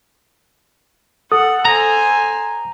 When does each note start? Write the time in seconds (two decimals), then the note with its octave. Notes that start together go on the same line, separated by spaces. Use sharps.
1.32 A4 F#5 D#6
1.65 C5 G#5 A#5